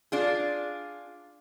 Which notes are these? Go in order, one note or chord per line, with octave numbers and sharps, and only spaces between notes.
D4 F4 G#4